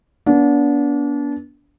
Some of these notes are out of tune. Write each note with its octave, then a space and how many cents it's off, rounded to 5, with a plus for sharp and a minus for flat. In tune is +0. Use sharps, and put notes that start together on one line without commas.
B3 -30 D4 -30